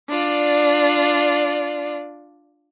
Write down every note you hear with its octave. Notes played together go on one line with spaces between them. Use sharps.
D4 F4 D5